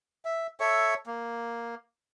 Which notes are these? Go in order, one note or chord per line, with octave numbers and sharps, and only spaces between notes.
E5
A4 C#5 E5 C#6
A#3